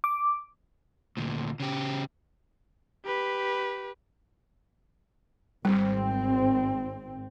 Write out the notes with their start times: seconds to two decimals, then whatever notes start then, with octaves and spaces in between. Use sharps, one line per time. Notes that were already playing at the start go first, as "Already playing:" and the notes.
0.04 D6
1.17 D2 A#2
1.60 C#3 G4
3.05 G4 B4
5.65 G#1 G3 C4